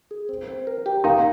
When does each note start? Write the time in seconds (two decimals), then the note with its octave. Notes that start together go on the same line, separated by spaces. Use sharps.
0.11 G#4
0.29 C4
0.47 C4
0.67 A#4
0.86 G4
1.04 A#3 D#4